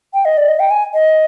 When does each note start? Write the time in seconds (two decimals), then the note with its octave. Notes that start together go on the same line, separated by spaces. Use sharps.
0.14 G5
0.25 D#5
0.37 D5
0.48 D#5
0.60 G5
0.71 G#5
0.94 D#5